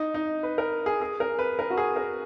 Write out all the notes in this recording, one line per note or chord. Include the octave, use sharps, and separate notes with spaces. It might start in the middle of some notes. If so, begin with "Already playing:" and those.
Already playing: D#4
D#4
B4
A#4
G#4
G#4
A#4
B4
A#4
F#4
G#4
A#4